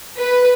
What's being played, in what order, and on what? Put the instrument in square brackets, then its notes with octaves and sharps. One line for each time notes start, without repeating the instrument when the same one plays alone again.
[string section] B4